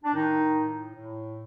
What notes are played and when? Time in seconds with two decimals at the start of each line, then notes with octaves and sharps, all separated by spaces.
0.03 D4
0.14 A2 D#3 D#4
0.54 A2
0.95 A2